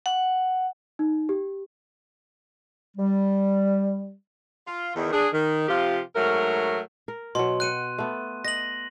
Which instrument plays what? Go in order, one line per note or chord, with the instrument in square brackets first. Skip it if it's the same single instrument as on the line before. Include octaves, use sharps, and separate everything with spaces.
[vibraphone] F#5
[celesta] D#4
G4
[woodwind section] G3
[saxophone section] F4
E2 D#3
D4 G#4
D#3
C3 F3 F4 G4
G#2 F#3 A3 A#4
[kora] A#4
[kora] B2 F#3 [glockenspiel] C6
[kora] F#5 G5 [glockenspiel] F#6 D#7
[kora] A3 B3
[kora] D#5 [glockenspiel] A#6 F#7